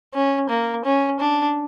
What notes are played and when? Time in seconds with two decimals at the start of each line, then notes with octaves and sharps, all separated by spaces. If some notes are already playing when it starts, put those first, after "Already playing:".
0.14 C#4
0.50 A#3
0.85 C#4
1.20 D4